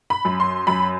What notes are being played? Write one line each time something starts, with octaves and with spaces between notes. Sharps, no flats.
B5
F#2
C6
F#2 B5